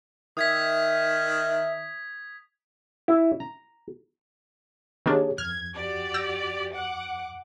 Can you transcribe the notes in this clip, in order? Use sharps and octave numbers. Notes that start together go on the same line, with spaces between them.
D#3 E5 D#6 G#6 B6
E4
A#5
D#3 A#3 D4 G4 G#4 C#5
F2 F6 G#6
F#4 G4 D5
E6 G6 A#6
F#5 D6